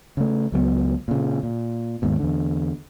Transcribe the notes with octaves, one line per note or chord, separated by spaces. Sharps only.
C#3 A3
C#2 F#3 G#3 B3
A#2 C#3
A#2
D#2 G#2 B2
E2 D3